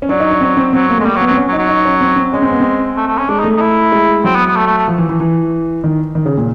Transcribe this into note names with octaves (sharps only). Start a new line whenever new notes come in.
C#4
F#3 D4
D#4
D4
C4
C4
F#3 C4
A#3
G#3 A3
G3 A#3
F#3
B3
F#3 C4
C#4
F#3
D#4
F#3
D#4
C#4
C4
C4
G#3 C#4
C4
B3
C4
A3
A3
C#4
G#3 D4
D#4
A3
D#4
E4
G#3
F#3 C4
B3
B3
A3
A3
A3
F3
E3
E3
E3
D#3
D#3
C#3
A#2